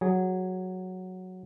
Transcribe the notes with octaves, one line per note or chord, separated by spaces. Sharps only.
F#3 G#4